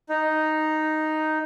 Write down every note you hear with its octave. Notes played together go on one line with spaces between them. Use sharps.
D#4